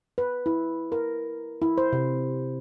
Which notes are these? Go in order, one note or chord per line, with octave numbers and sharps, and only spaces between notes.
B4
E4
A#4
E4
C5
C3